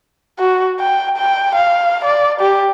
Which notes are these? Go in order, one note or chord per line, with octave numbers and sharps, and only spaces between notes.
F#4
G5
G5
F5
D5
G4